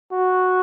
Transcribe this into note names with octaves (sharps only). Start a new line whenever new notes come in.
F#4